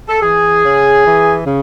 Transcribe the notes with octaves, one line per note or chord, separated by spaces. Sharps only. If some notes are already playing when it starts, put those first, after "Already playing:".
A4
E3 G#4
C#3
E3
C#3